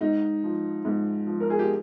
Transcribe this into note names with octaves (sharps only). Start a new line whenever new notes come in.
G#2 D#4
F3
G#2
F3
A#4
G#4
G4